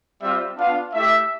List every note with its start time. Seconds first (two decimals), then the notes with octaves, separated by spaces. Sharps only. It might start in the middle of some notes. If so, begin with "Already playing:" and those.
0.22 G3 C4 F4 E5
0.58 B3 D4 F4 F5
0.94 A3 E4 G4 E5